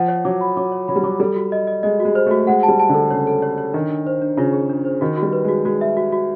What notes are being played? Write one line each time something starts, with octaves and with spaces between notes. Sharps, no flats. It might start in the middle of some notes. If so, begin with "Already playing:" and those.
Already playing: F3 F#5
C#5
F#3 D6
B5
F#3 D6
C#5
F#3 B5
G3
F#3 D6
G3 A4
F#4
D#5
D#5
G#3 D#5
F#4
G#3
C5
A3 F#4
G#3 F#5
A5
G3
A5
D3
A4
C#3 C#5
A4
C#5
C#5
D#3 D4
D4
C5
D4
C#3 F4
G#4
D4
C5
D#3 F#4
F#4
G3
B4
G#3 F#4
G#3 F#4
E5
F#4
F#4